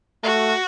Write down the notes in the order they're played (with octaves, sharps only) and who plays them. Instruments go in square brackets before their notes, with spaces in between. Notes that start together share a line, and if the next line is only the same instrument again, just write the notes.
[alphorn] A3 [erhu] F#4